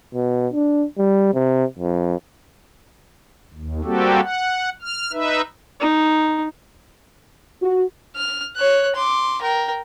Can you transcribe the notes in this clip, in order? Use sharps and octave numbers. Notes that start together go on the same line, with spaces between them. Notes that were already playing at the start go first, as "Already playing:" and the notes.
B2
D4
G3
C3
F2
D#2
G3 A#3 C4 F#4 G4 A4
F#5
F6
D#4 B4 E5
D#4
F#4
F6
C#5 F#6
C6 D6
A#4 G5